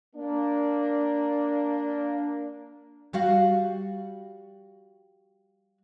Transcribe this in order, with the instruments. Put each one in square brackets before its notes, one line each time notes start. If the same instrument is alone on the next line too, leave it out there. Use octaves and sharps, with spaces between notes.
[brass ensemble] A#3 D4
[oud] G3 F#4 F5